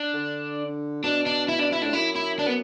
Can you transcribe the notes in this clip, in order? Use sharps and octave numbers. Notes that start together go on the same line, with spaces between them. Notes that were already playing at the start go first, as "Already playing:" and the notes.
Already playing: D4
D3
B2 D4
D4
E4
D4
E4
A2 D4
F#2 E4
E4
D4
B3